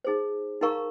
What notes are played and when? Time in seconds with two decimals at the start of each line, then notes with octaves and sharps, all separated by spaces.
0.05 D#4 G#4 C5
0.61 D#4 A#4 F5 A#5 C#6